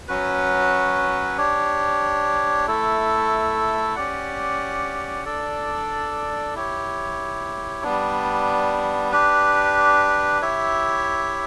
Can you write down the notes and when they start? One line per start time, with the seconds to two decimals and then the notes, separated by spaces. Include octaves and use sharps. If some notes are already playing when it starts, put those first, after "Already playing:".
0.08 F#3 C#4 F#4 B4
1.38 D4 G4 C#5
2.67 A3 E4 A4
3.95 C#4 G4 D5 F#5
5.25 D4 A4 D5
6.55 E4 G4 C#5
7.83 G3 B3 D4
9.12 D4 G4 B4
10.41 E4 G4 C#5 E5